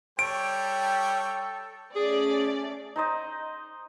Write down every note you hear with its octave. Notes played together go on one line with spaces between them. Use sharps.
G3 A4 C#5 G5 D7
A3 C#4 G#4 D5
D#4 C5 D#5